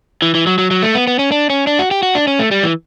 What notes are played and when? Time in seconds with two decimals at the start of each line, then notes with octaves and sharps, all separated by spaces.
0.22 E3
0.35 E3
0.47 F#3
0.58 F#3
0.71 F#3
0.83 A3
0.94 B3
1.07 B3
1.19 C#4
1.32 D4
1.50 C#4
1.67 D4
1.79 F#4
1.91 G4
2.03 F#4
2.15 D4
2.27 C#4
2.39 A3
2.51 G3
2.63 E3